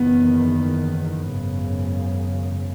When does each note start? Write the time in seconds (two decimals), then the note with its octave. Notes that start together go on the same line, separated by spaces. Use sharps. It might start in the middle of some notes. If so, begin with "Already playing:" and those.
Already playing: F#1 E2 D#3 B3
1.29 G#1 F#2 C#3